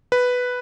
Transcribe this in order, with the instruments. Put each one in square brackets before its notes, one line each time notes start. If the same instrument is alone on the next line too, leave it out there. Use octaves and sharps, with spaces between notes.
[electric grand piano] B4